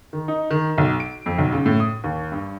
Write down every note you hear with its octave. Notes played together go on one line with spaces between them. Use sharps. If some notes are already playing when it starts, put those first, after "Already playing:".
D#3
D#4
D#3
B1
D7
F2
B1
C#3
A2
D#6
D#2
G2